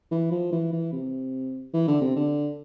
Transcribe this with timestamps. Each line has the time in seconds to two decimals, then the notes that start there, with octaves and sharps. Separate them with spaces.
0.11 E3
0.31 F3
0.52 E3
0.72 E3
0.92 C3
1.73 E3
1.88 D3
2.01 C3
2.16 D3